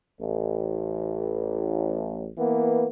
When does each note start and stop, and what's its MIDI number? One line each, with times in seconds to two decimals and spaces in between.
0.20 2.28 33
2.38 2.87 52
2.38 2.87 58
2.38 2.87 59